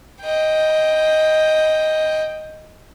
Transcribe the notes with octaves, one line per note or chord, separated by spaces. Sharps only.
D#5 G5